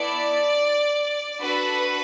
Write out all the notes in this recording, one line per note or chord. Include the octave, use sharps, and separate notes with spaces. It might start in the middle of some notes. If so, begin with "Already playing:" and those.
Already playing: B3 E4 A4 D5
D4 F#4 A4 B4